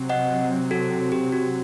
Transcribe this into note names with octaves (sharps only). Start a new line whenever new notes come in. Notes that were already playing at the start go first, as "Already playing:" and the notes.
Already playing: C3 F#3 C4
D#5 F#5
F#4 A4
G4
F#4